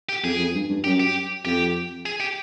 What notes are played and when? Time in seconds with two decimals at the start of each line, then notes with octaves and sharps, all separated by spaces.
0.09 G4
0.24 F2 G#4
0.39 F2
0.54 G2
0.69 G2
0.84 F#2 G4
1.00 G4
1.45 F2 G4
2.06 G#4
2.20 G4